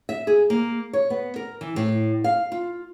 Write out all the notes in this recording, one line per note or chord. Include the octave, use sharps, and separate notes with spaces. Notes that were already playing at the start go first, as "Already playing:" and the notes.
E5
G#4
A#3
C#5
B3
A#4
E3
A2
F5
F4